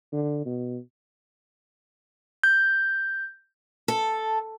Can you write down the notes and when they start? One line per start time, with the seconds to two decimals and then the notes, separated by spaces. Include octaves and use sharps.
0.12 D3
0.45 B2
2.44 G6
3.88 A4